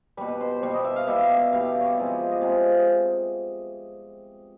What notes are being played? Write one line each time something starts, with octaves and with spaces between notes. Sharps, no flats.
B2 G3 B4
B4
C5
C5
B2 G3
D#5
E5
F5
B2 G3 E5
E5
E5
E5
B2 G3 F5
E5
D5
C#5
D5
C3 F3 G#3 D#5
D#5
E5
D#5
C3 F3 G#3 E5